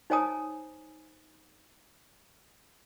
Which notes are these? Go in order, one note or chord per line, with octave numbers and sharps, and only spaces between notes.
D#4 C5 C#5 G#5 A#5 D#6